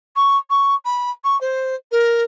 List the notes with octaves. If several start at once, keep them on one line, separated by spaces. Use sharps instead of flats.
C#6
C#6
B5
C#6
C5
A#4